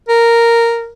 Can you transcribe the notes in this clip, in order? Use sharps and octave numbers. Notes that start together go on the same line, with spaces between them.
A#4